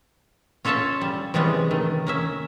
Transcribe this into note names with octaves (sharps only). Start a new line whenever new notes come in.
C#4 F4 A4 C#5 E5 A5
G3
C3 E3 G3 G#3 B3 C#4
D#3 A3
A#3 C#4 E5